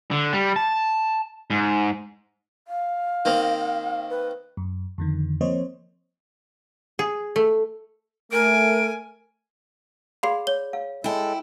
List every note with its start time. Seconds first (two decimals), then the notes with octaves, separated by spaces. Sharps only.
0.11 D3
0.33 G3
0.56 A5
1.50 G#2
2.68 F5
3.25 D#3 A#3 C4
4.10 B4
4.57 F#2
4.98 F2 D3 D#3
5.41 F3 A#3 C4 C5 C#5 D#5
6.99 G#4
7.36 A3
8.32 A3 A#4 G#5 D7
10.23 G#4 D5 F5 B5 C6 C7
10.47 C#5 G7
10.73 F5
11.04 G#3 E4 A4 G5